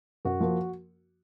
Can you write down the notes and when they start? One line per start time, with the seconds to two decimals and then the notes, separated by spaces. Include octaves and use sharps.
0.25 F#2 F#4
0.40 F3 A#3